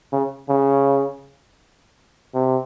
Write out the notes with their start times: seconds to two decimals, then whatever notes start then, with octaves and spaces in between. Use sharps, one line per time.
0.12 C#3
0.49 C#3
2.34 C3